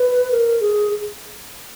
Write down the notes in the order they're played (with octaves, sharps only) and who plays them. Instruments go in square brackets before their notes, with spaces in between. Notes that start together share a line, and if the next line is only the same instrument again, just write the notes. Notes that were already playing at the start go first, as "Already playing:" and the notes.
Already playing: [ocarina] B4
A#4
G#4